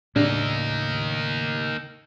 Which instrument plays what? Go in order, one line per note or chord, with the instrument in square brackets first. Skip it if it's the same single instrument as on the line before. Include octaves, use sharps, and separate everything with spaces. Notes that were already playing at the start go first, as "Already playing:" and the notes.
[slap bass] A2 C#3 [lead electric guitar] A#3 D#4 [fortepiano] D4